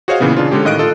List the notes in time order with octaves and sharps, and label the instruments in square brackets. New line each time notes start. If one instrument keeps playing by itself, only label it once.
[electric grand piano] F#4 G#4 C5 C#5 D#5 F5
A#2 C#3 E3 B3
C#3 D4 F4
D3 G#3 C#4 G4
A2 D#3 D#5 F5 F#6 D7
F4 A4 D#5